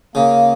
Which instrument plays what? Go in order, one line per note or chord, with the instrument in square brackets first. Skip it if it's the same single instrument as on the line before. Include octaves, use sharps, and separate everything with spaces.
[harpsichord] C#3 [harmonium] A#3